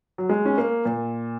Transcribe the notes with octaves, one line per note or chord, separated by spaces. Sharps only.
F#3
G#3
C#4
A#3
A#2